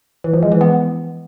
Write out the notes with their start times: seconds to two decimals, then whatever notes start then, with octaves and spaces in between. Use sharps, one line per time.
0.24 E3
0.33 F3
0.43 G#3
0.52 E3
0.61 B3